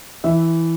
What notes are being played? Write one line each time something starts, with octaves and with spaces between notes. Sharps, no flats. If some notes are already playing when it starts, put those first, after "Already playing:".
E3 E5